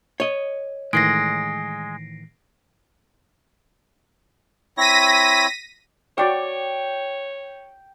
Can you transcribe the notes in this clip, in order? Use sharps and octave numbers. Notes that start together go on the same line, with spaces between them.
C#5 D#5
A2 D#3 E3 G#3 A#6 C7 D7
C4 E4 C#5 A#6 B6 D#7
F#4 C#5 D5 G5 C#6